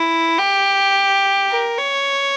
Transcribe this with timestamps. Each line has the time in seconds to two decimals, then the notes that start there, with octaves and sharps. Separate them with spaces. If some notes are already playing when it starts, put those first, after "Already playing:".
Already playing: E4
0.38 G4
1.50 A#4
1.78 C#5